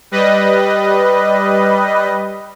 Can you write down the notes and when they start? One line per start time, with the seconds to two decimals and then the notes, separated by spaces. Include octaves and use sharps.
0.11 G3 B4 D#5